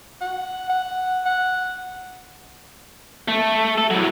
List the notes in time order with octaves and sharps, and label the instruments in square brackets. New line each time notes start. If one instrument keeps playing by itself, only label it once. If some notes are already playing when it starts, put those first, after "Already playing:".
[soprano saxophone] F#5
F#5
F#5
[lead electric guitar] A3
A4
A2 F#3